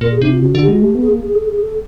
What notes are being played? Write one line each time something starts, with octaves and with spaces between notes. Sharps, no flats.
A#2 A#4
G#4
C3 D#4
F4
C#3 F#4
F#4
D3
G4
G#3 F#4
A3 G4
B3
G#4
A#3
G#4
A4
G#4
A4